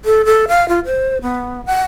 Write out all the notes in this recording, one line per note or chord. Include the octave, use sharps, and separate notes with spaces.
A4
A4
F5
F4
C5
B3
F#5